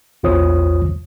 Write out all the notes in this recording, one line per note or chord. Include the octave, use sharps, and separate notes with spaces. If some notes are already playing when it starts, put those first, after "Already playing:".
A#1 E2 F4 C5 C#5 D#6